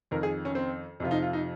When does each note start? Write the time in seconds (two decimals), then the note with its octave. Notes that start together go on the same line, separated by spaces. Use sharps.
0.11 F2 D#3 A#4
0.23 G#4
0.45 C#4
0.55 C4
1.00 F2 C3 F3 F4
1.11 D#4
1.22 F4
1.33 D#4